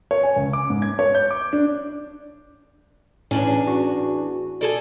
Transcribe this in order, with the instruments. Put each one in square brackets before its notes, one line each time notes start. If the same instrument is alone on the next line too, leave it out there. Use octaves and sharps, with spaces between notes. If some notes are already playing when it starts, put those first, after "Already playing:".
[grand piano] C#5
G#5
C#2
D6
G#2
G#6
C#5
G6
D6
D4
[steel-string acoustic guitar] E2 D4 G#4 [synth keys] A2 C#4
[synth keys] F#4
[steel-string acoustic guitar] G#4 A4 D5